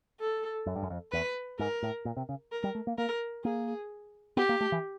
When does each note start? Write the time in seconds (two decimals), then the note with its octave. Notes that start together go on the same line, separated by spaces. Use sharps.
0.20 A4
0.66 F#2
0.76 G2
0.83 F#2
0.90 F2
1.12 E2 B4
1.59 G#2 A#4
1.83 A2
2.05 A#2
2.17 C3
2.29 C#3
2.52 A#4
2.64 G3
2.75 A3
2.87 A#3
2.98 A#3 A#4
3.44 A#3 G#4
4.37 B3 G4
4.49 A#3
4.61 A3
4.72 E3